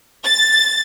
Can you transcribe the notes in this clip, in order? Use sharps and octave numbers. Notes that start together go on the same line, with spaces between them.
A6